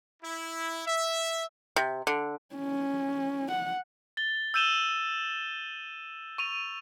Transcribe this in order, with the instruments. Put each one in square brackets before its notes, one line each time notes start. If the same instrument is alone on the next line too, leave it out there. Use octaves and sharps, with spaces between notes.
[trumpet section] E4
E5
[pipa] C3
D3
[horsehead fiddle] C#4
F#5
[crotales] A6 G7
E6 G6 D#7 E7 G7
C#6 D#7 F7